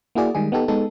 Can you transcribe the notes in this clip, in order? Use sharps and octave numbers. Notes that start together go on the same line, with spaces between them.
A#3 E4 F#4 G#4 D5
D#3 G3 G#3 G#4
B3 D#4 G4 A4
G#3 B3 D#4 A4